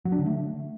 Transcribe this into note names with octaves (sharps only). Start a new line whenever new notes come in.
F#3
D4
D3
A3